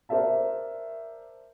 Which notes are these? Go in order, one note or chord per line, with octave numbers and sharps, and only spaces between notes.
A#4 C5 D5 E5 A5